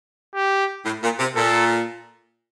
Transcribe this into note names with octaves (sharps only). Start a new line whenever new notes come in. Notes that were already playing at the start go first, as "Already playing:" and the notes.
G4
A2
A#2
C3
A#2 A4